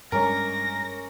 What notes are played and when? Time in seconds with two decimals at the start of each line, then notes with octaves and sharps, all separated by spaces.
0.12 G2 G3 G#3 A#3 C#4 A#4 C#5 A#6